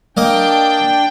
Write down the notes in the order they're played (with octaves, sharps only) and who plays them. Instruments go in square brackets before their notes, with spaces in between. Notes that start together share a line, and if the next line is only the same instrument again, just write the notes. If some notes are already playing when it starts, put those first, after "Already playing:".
[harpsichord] A#3 D#5 D6 [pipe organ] D4 G5